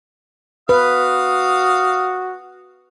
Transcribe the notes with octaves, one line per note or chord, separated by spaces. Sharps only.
F#4 B4 F5 D#6